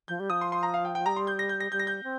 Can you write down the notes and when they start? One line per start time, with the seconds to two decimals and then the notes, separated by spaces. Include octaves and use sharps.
0.08 F3 G6
0.20 G3
0.30 F3 D#6
0.41 C6
0.52 C6
0.63 A#5
0.74 F5
0.85 G5
0.95 G5
1.06 G3 A#5
1.16 C6
1.27 G6
1.39 A#6
1.49 G6
1.60 A#6
1.72 G3 G6
1.79 A#6
1.87 G6
2.04 C4